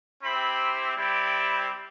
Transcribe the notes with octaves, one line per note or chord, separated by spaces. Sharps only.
C4 E4 G4 B5
G3 C4 E4 G4